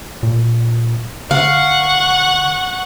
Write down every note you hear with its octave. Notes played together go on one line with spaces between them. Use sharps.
A#2
D3 F5 F#5 C#6